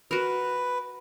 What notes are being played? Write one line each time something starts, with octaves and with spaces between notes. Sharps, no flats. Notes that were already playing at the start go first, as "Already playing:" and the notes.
F#4 A#4 B4